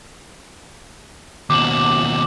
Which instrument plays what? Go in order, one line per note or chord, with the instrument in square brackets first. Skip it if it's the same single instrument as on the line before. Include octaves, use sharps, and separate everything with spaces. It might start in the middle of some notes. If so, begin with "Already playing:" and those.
[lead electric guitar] D#2 B2 [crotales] D6 F#7